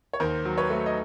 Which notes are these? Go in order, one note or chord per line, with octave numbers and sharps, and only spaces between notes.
C#5
D#2 A#4 C5
F#3
B4 C#5
A3
D#5